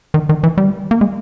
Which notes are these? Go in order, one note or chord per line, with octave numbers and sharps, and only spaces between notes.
D#3
D#3
E3
G3
A#3
G#3